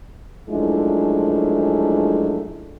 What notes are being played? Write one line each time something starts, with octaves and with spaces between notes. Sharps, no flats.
F#2 F3 G#3 A3 D4 E4